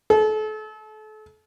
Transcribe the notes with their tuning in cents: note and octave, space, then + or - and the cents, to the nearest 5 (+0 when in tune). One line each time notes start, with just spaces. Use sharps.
A4 -35